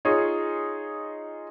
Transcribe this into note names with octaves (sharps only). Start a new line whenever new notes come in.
D#4 F4 G#4 C#5